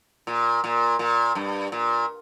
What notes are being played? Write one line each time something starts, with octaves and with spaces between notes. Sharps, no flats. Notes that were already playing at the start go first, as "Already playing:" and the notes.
A#2
A#2
A#2
G2
A#2